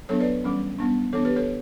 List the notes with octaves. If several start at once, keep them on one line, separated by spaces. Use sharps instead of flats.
F#3 B3 D4 A4 C#5
B4 D5
E3 G3 C#4
G3 B3 D4
E3 B3 D4 A4 C#5
G4 B4
A4 C#5